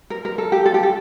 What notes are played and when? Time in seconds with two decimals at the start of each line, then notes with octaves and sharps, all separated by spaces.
0.10 A#4
0.25 A#4
0.38 A4
0.52 G4
0.66 A4
0.74 G4
0.83 A4